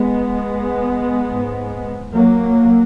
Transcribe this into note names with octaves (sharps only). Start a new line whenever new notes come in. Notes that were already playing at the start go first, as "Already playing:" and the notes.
Already playing: G#3 B3
G#2
F#3 A#3